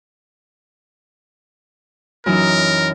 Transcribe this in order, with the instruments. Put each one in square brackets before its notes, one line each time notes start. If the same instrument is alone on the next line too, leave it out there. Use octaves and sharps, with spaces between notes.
[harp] F#2 E3 D#4 [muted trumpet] A#4